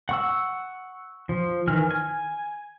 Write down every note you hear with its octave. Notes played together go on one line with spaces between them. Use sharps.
F#5 C#6 E6
F3
D#3 E3 G#5 F6
G#5